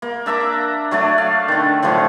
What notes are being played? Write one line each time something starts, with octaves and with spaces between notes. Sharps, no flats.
A#3
D4 E5 A#5 D6
F#3 A3 D4 D5
F5
D3 D#3
A2 D3 F3 F#3